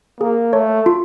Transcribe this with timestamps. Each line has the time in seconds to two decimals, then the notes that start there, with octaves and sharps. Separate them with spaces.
0.21 A#3 G#4
0.53 A3 C#5
0.86 F4